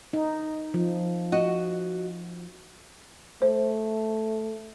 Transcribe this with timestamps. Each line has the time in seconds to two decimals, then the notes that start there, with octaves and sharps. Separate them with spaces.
0.13 D#4
0.74 F3
1.32 F#4 D#5 F#5
3.42 A3 C5